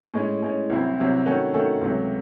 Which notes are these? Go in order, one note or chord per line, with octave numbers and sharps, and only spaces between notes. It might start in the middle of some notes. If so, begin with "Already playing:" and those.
A2 G#3 C#4
A2 G#3 C#4
C2 C3 F#3 C4 E4
C2 C3 F#3 C4 E4
D#3 A3 C#4 F#4 A4
D#3 A3 C#4 F#4 A4
C#2 C3 F#3 A3